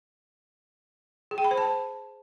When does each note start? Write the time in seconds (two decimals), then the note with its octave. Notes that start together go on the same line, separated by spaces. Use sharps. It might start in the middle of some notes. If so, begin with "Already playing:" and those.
1.31 G#4
1.38 G5
1.44 B5
1.51 C5
1.58 A5